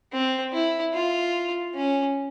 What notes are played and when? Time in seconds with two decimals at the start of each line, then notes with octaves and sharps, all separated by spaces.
0.12 C4
0.53 E4
0.93 F4
1.75 C#4